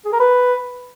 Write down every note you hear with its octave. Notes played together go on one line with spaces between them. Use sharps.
G#4
A#4
B4